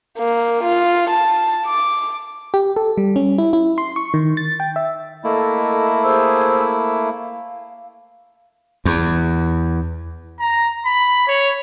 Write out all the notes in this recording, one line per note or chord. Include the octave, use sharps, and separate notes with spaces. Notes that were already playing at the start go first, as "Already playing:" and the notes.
A#3
F4
A5
D6
G4
A4
G3
C#4
E4
E4
C6
C#6
D#3
A6
G5
E5
A3 A#3 E4 A4 D#5
G#4 C5 E6
F5
E2
A#5
B5
C#5